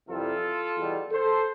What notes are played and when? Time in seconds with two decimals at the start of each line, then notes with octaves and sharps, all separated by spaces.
0.08 F2 C3 E3 G3 F4 A4
0.76 E2 B2 G3
1.11 A4 C5